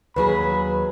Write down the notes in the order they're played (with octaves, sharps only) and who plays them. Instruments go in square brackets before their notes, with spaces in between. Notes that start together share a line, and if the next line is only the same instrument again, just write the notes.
[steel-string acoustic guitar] D#2 F#3 G#4 [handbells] B4 [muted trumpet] B5